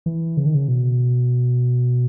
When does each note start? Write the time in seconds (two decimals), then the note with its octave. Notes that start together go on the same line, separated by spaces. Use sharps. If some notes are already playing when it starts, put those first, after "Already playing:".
0.06 E3
0.37 C#3
0.46 D#3
0.55 C#3
0.68 B2